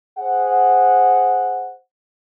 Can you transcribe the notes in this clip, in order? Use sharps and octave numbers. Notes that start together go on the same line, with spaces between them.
G#4 C5 F#5